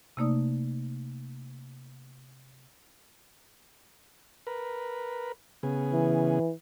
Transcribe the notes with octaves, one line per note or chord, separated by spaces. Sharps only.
C3 A3 A#3 D#4 D5 D#6
A#4 B4
C#3 B3 G#4
E3